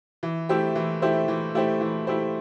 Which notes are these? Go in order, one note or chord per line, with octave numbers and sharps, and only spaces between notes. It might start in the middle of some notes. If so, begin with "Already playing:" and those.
E3
A3 E4 G4 C5
E3
A3 E4 G4 C5
E3
A3 E4 G4 C5
E3
A3 E4 G4 C5